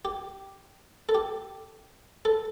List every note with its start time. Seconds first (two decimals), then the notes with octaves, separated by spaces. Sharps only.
0.05 G4
1.09 A4
1.15 G4
2.25 A4